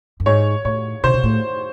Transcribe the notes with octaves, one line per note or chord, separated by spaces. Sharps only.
F#2
G#2 C#5
A2 C#5
C3 C5
C3
A2